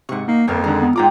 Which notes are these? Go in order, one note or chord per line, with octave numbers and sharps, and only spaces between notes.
G#2 C3 F#5 C#6
A#3 D#4
G1 F2 A#3 D4 F4 A#5
D3 D#3 G#3 A#4
B3
G#2 F4 D5 F5 G5 A#5 D6